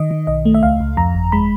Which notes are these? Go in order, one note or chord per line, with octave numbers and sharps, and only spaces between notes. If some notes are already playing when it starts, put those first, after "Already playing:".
Already playing: D#3 D#5
D#3
B1 D#5
A3
E5
C#2 F5
C#2
F2 A#5
G1
G#3 B5